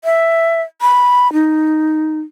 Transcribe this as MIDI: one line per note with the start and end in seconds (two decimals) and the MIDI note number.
0.05 0.62 76
0.81 1.32 83
1.33 2.20 63